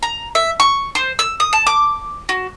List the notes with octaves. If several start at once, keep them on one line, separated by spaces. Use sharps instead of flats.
A#5
E5
C#6
C5
E6
D#6
A5
D6
F#4